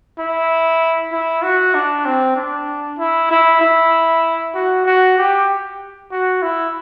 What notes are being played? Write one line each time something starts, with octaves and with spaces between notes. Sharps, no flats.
E4
E4
F#4
D4
C4
D4
E4
E4
E4
F#4
F#4
G4
F#4
E4